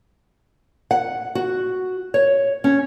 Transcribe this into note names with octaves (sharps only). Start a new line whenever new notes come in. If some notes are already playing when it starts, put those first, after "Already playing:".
F#5
F#4
C#5
C#4